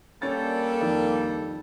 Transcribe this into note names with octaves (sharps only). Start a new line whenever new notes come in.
G3 A#3 C#4 D4 A4 A6
F2 D#3